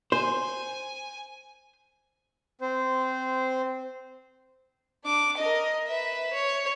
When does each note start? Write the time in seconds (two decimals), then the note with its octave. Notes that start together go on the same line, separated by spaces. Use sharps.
0.12 C5 G#5
2.61 C4 C5
5.04 D4 D6
5.38 A#4 D#5
5.88 B4 E5
6.34 C#5